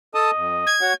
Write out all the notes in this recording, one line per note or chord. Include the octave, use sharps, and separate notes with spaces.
A4 D#5 A5 D#6
F2
G#6
F#4 C#5 F#5